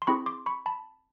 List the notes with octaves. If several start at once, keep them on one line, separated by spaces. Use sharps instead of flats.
C6
C4 E4 G#4 B5 C#6
C6 D6
B5 C#6
A5 B5